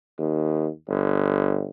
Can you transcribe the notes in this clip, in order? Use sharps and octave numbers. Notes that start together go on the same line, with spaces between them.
D#2
G1